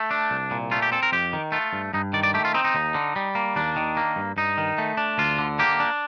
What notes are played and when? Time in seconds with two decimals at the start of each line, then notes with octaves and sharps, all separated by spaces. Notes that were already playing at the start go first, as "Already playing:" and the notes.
Already playing: A3
0.11 D4
0.31 C2
0.51 A#2
0.71 A3 F4
0.82 G4
0.92 C4 A4
1.03 A#4
1.12 F2 G4
1.33 D#3
1.52 A3 F4
1.73 G2
1.94 G2 D#4
2.13 D#3 D5
2.23 D5
2.34 A3 G4
2.45 F4
2.54 C4 D#4
2.64 D#4
2.75 D#2
2.94 D3
3.16 G3
3.35 A#3
3.56 D#2 D4
3.76 D#3
3.97 A#3
4.16 G2
4.37 G2 D#4
4.58 D#3
4.78 A3
4.97 D4
5.18 D2 F4
5.39 D3
5.59 A#3 G4
5.80 D4